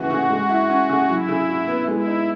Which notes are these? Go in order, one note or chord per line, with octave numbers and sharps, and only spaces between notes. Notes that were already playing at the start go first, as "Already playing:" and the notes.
Already playing: C#3 E3 A3 F#4
C#3
G#3
E4
C#4
C#3
F#3 E4
C#3
F#4
B3
G#3 E4
D#4